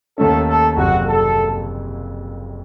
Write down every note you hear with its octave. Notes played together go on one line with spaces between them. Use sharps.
D#2 D#3 A3 C#4 A4
A4
F#1 F2 C3 F#3 C4 F#4
A4